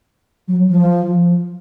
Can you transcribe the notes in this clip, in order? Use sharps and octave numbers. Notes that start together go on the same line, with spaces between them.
F#3
F3